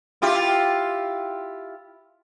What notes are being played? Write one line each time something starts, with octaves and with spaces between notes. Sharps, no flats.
E4 F4 G4